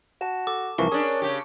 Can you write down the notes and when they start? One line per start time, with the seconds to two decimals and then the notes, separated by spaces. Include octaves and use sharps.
0.21 F#4 A5 E7
0.47 A4 D6
0.78 C2 E3 F3 A#4 A5 C#6
0.92 C#4 D4 G#4
1.22 C#3 G4